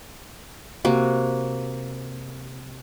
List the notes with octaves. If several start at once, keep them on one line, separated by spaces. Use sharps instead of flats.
C3 A#3 F#4